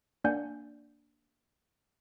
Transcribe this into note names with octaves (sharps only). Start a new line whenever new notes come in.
A#3 D4 D5 F#5 G#5 G6